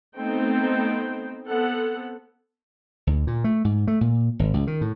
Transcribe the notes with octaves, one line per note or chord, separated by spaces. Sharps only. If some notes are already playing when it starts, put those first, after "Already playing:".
A3 B3 C4 D#4 C5 G5
B3 C4 A4 F#5
D2
A#2
A3
G#2
A3
A#2
G#1
C#2
D#3
A2